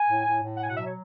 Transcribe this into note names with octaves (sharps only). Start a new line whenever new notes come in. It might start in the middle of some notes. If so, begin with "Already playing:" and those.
Already playing: G#5
A2
A2
A2
F#5
B2 G#5
F#5
F#3 E5
C#5